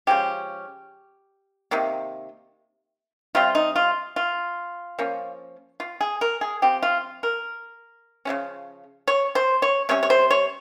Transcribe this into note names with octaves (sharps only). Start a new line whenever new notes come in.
C#3 F3 G#3 C#4 G4
C3 D#3 A#3
C3 G3 C4 F4
D#4
F4
F4
F3 A#3 C#4
F4
G#4
A#4
G#4
F3 C4 G4
F4
A#4
C#3 F3 G#3 C#4
C#5
C5
C#5
C3 G3 C#4 C#5
C#5
C5
C#5